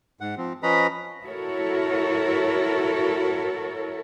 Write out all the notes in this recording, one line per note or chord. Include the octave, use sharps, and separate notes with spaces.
G#2 F#5
F3 C4
F3 C#4 B4 D#5 A#5 B5
E4 F#4 A4 A#4 C#5